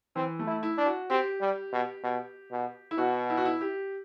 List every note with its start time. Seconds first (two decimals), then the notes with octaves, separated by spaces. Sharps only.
0.16 E3 C4
0.39 A3
0.47 E4
0.63 E4
0.78 D4
0.86 F#4
1.10 C4 G4
1.41 G3
1.73 B2
2.03 B2
2.51 B2
2.91 E4
2.98 B2 F#4
3.30 E4
3.37 F#4
3.45 E4
3.61 G4